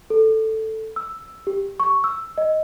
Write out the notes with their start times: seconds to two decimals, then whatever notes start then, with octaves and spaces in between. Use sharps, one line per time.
0.10 A4
0.96 E6
1.47 G4
1.80 C#6
2.04 E6
2.38 D#5